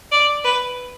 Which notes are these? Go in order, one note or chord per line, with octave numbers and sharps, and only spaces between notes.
D5
B4